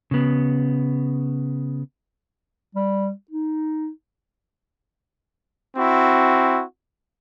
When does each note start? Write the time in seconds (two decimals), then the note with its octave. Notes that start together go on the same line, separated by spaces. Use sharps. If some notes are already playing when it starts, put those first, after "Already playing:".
0.11 C#3 B3
2.75 G3
3.31 D#4
5.77 C4 E4 F#4